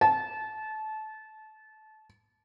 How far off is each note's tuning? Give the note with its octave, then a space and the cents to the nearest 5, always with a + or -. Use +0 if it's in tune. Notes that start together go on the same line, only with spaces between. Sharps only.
A5 -25